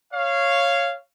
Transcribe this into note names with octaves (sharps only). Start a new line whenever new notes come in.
C#5 F5